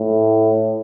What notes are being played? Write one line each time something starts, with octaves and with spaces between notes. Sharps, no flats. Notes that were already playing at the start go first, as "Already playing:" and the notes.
Already playing: A2